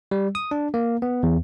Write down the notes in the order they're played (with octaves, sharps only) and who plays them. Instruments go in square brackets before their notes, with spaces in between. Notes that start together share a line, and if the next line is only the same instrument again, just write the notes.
[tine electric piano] G3
D#6
D4
A#3
B3
E2